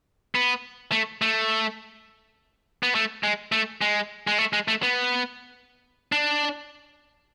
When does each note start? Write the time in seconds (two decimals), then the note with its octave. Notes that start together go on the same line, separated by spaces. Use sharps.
0.35 B3
0.92 A3
1.22 A3
2.83 B3
2.95 A3
3.23 G#3
3.52 A3
3.81 G#3
4.27 G#3
4.39 A3
4.53 G#3
4.68 A3
4.83 B3
6.12 D4